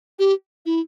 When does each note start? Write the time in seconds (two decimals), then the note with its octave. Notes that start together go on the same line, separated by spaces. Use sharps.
0.19 G4
0.66 E4